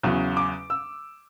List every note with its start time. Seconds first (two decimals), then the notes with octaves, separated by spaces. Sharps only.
0.03 E2 C#3 F#3
0.37 D6
0.70 E6